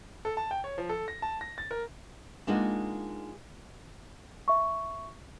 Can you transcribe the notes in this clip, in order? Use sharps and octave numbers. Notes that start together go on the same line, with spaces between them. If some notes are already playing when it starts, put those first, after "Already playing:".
A4
A5
G5
C#5
F3
A4
A#6
A5
A#6
A6
A#4
G#3 A#3 D4 D#4 F4 F#4
E5 C#6